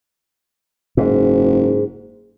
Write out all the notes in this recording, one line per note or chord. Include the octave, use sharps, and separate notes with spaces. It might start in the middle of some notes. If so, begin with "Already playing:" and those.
F#1 G#2